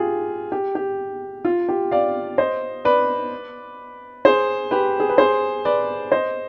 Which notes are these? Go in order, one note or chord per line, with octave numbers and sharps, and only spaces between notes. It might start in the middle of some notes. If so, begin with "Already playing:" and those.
Already playing: F4 G4 G#4
G4
G4
F4
G4
D5 F5
C5 D#5
B4 D5
G#4 C5
G4 B4
G#4
B4
G#4 C5
B4 D5
C5 D#5